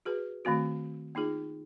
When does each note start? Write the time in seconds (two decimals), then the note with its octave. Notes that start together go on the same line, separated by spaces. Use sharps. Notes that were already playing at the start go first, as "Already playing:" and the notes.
0.05 F#4 G#4 B4
0.45 D#3 A3 C4 F#4
1.15 A#3 D#4 F4 G#4